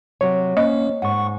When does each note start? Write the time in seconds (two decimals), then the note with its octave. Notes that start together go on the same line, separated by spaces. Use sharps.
0.21 C3 F#3 C#5
0.57 A#3 C#4 C5 D#5
1.02 G#2 F#5 C#6